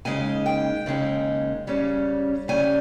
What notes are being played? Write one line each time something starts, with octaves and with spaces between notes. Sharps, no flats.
D#2 C#3 G#3 D#4 G#5
G5
D#2 C#3 G#3 D#4
C#3 G3 C#4
C#3 G3 C#4 G#5